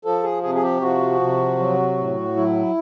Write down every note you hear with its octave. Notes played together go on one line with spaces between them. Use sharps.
F3 A4
G#4
C3 G#4
G#4
G4
F3 F#4
C3
F#3
A2
F#3 E4